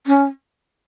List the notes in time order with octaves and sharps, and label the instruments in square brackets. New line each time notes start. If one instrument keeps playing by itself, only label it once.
[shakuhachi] C#4